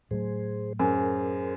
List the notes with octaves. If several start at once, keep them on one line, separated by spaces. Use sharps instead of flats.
A2 F#3 A3 G#4 C5
F#2 G#4 A#4 C5